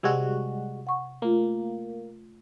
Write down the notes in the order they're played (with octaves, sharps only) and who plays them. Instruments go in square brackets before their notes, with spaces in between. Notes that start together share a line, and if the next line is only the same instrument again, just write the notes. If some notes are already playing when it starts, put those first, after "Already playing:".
[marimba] C3 E6 G#6 [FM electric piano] G3 G#3 F#4
[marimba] F#5 C#6
[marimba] A3 F4 [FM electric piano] A#3